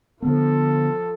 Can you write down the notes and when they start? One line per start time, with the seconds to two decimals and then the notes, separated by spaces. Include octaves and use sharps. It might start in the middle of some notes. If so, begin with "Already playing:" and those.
0.22 D3 F3 B3 A4